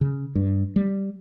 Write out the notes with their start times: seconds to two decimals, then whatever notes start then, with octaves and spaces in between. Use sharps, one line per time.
0.01 C#3
0.35 G2
0.76 G3